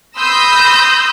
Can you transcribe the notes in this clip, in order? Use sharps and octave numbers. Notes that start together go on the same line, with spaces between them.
B5 C6 D#6 E6 G6 A#6